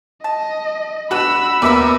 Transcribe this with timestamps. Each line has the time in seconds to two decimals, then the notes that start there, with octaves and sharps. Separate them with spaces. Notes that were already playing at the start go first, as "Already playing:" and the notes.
0.24 D#5 A5
1.11 D4 F#4 B4 B5 E6
1.62 D#2 B3 A#4 D5 E5 B5 E6